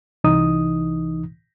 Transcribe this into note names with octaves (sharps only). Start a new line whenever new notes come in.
C2 E3 D#4 D#6